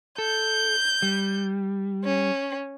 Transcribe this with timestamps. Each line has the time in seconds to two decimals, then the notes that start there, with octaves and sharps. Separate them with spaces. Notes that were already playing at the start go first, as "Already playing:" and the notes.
0.18 A4 G6
1.02 G3
2.04 C#4